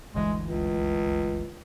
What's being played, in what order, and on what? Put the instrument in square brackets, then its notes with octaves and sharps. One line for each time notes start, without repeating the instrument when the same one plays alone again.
[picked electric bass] G1 D2 E3 [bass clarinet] G#3
[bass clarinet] C#2